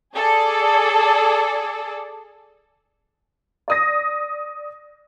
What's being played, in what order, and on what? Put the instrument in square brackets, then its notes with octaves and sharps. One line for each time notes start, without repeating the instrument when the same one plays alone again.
[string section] G#4 A4 D5
[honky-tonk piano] D5 D#6 A#6